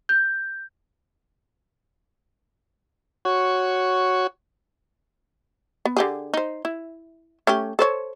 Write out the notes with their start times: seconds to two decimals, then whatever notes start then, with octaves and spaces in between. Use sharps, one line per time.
0.09 G6
3.25 F#4 C#5
5.85 B3
5.97 D3 G4 G#4
6.34 D#4 C5
6.65 E4
7.47 A3 C#4 G4
7.79 A4 C5 C#5